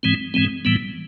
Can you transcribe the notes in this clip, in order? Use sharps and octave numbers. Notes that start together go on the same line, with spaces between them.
G#2 E3 G#3 C4
G#2 E3 G#3 C4
A2 E3 G3 B3